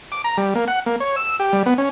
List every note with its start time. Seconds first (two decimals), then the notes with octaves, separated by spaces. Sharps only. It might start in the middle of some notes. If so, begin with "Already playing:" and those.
0.12 D6
0.24 A#5
0.37 G3
0.55 A#3
0.68 F#5
0.86 A#3
1.00 C#5
1.16 E6
1.40 G4
1.53 G3
1.66 B3
1.78 C#4